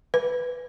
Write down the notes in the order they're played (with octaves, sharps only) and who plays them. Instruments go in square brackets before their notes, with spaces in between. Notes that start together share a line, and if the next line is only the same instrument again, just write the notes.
[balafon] B4